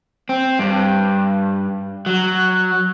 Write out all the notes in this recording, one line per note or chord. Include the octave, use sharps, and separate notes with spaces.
C4
G2
F#3